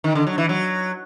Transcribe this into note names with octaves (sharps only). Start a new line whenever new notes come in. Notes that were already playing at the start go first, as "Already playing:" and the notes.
D#3
D3
F#3
E3
F#3